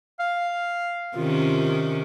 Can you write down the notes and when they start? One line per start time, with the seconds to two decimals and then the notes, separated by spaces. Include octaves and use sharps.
0.20 F5
1.16 C3 D#3 C#4 F4